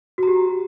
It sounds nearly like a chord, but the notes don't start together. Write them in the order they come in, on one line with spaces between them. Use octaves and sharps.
F#4 A#5 G4